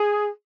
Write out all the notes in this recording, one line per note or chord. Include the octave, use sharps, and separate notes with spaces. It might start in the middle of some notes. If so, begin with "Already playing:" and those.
Already playing: G#4